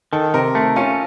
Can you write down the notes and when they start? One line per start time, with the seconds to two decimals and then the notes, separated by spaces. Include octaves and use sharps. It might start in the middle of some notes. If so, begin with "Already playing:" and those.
0.13 D#3 A4
0.34 C3 A#4
0.55 A3
0.76 C#4 F4